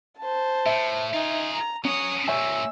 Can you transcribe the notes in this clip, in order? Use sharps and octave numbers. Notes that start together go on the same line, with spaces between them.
C5 A5
A2 E5
D#4 F4 G#4
A#5
F#3 C#4 C#5 D#6
C#2 A#2 C#5 E5 G#5 E6